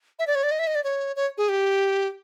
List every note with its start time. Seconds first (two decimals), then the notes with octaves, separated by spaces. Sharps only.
0.19 E5
0.27 D5
0.35 C#5
0.43 D5
0.51 D#5
0.59 E5
0.67 D#5
0.75 D5
0.84 C#5
1.16 C#5
1.38 G#4
1.49 G4